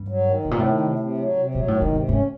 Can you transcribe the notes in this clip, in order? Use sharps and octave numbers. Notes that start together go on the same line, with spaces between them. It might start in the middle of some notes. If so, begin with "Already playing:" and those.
Already playing: G2
F#3
D#3
A2 C3
A#2
A2 D#3
C3
C3
F#3
C3
A#2 F#3
A2
D#3
A2
G#2 C3
G#2 C#4